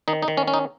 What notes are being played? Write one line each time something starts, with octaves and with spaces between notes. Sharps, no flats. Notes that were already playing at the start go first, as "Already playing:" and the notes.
D#3 D#4
D#4
D#3
C#4
C#4
D#4